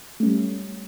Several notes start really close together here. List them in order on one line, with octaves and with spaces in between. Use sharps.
A3 C#4 G3